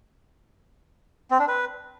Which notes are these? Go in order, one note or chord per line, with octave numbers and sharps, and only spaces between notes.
C4
D4
B4